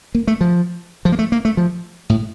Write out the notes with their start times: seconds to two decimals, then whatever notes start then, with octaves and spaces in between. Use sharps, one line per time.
0.15 A#3
0.27 A3
0.41 F3
1.05 F3
1.12 A#3
1.19 A3
1.32 A#3
1.45 A3
1.57 F3
2.10 A2